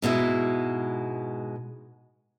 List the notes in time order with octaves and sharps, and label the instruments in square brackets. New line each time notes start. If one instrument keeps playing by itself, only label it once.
[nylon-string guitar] G#2 B2 G#3 E4